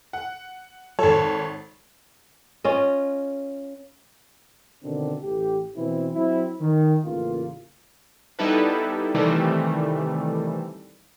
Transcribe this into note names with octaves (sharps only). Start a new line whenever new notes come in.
F#5
G#1 A4 C#5
C#4 F4 D#5
B2 D3 D#3 C4 D4
A1 A3 G4
B2 E3 C4 E4
F#3 C4 E4
D#3
A1 C#3 A#3 F4
G3 B3 D#4 E4 A4 B4
C3 D#3 E3 G3 A3